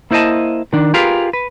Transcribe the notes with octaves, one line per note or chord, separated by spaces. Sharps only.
A#3 E4 C5 D5 D#5 A5
D#3 D4
F4 G4 G#4 A#4 B4 F5
B4